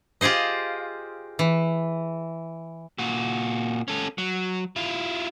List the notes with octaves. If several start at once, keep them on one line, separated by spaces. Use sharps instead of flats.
F4 G4 G#4 C5 D#5
E3
A#2 F#4
C#4 A4
F#3
E4 F4